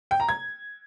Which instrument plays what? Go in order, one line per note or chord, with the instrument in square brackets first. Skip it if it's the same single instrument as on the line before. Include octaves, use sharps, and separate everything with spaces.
[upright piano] G5
A#5
G#6